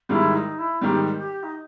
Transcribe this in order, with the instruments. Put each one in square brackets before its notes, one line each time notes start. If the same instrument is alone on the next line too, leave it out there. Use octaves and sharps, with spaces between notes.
[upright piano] G#2 D#3 G3 [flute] E4
[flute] D#4
E4
[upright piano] G#2 D#3 G3 [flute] G4
[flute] G4
D#4